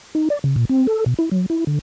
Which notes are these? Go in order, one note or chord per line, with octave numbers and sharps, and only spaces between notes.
D#4
D5
C#3
A#2
C4
A4
B2
E4
F#3
E4
D3